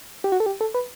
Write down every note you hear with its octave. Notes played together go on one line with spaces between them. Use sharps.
G4
F#4
A4
G4
A4
B4